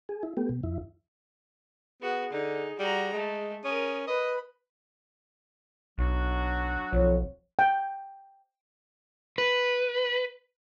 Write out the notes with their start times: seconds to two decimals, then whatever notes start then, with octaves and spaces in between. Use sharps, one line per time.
0.09 G#4
0.23 E4
0.37 A3 B3 G4
0.49 B2
0.63 F2 E4
2.02 B3 F#4 G#4
2.32 D3 D#4
2.79 G3 F#4 A#5
3.13 G#3 A3
3.65 C#4 A#4 D#6
4.07 B4 D#5 B5
5.98 B1 F#3 D4 F#4
6.93 B1 F2 F3 C#5
7.59 G5
9.38 B4